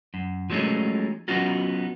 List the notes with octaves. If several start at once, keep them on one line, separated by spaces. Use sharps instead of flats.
F#2
F3 F#3 G#3 A3 C#4 D#4
F#3 B3 C#4 D#4 F4 F#4